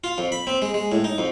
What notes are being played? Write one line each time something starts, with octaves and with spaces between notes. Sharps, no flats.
F4
F2
B5
C4
G#3
G#3
A2
D#4
F2